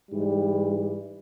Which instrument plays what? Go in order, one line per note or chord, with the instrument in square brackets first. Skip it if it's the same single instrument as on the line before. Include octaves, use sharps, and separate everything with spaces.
[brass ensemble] G#2 E3 G3